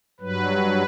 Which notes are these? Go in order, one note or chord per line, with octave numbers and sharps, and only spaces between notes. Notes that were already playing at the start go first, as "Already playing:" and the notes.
G2 F#3 B4